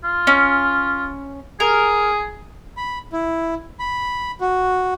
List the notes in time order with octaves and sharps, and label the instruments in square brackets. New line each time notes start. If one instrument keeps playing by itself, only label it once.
[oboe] F4
[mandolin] C#4
[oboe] G#4 [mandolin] A#4
[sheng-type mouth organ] B5
E4
B5
F#4